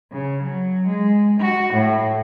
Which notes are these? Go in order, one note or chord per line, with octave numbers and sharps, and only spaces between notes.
C#3
F#3
G#3
F#4
A2